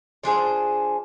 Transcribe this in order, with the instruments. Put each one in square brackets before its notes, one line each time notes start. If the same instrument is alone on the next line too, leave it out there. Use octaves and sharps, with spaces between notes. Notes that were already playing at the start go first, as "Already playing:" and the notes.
[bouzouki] F3 D4 G#4 C5